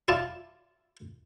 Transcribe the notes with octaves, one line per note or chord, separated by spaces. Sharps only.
E4 F4 D5 A5